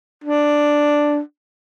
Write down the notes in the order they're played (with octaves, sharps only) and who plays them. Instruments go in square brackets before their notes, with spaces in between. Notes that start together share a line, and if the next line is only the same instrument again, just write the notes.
[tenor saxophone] D4